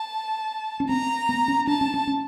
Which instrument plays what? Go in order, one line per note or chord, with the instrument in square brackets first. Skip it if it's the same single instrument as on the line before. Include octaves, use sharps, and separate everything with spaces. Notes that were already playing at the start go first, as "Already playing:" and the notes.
Already playing: [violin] A5
[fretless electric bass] C#4
[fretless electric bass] C4 [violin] A#5
[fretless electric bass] B3
C#4
[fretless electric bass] D4 [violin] A5
[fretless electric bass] C#4
C#4
C#4